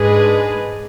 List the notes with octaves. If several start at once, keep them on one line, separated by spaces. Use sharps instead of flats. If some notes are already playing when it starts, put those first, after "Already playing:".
Already playing: G#2 G#3 D4 G#4 B4